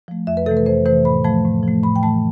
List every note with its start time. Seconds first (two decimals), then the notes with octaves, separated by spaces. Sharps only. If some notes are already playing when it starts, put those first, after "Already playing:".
0.08 F3 A3
0.27 F2 E5
0.37 B4
0.46 C3 E3 A3 A4
0.57 B4
0.66 F2 C5
0.86 C3 E3 A3 C5
1.05 A2 B5
1.24 F3 A3 A5
1.45 A2
1.63 F3 A3
1.83 A2 B5
1.96 G5
2.03 E3 A3 A5